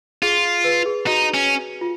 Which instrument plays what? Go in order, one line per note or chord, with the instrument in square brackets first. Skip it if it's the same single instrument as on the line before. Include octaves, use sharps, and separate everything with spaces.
[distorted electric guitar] F4 [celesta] G#4
[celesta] B4
G#4
[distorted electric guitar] D#4 [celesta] F#4
[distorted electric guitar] C#4
[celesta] F4